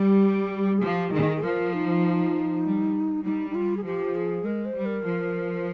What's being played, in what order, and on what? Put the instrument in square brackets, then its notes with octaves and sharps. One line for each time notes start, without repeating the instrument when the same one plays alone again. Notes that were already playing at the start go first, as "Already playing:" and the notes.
Already playing: [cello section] G3 [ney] G4
[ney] G#4
[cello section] F3 [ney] G4
[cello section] D#3 [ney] G#4
[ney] G#4
[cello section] F3 [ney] A#4
[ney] D#4
[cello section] G3
[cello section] G3 [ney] D#4
[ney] D#4
F4
G#4
[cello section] F3 [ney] G4
[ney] G#4
[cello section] G#3 [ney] A#4
[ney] C5
[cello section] G3
[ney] A#4
[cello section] F3